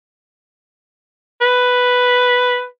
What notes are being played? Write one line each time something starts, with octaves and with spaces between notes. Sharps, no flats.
B4